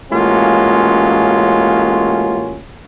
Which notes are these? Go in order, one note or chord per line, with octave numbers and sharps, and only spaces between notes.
A1 G#3 A#3 C#4 F4 F#4